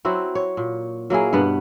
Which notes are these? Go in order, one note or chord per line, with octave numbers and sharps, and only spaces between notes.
F#3 C4 E4 F#4
C#5
A#2
F#3 A#3 E4 G#4
G2 B2 B3 F#5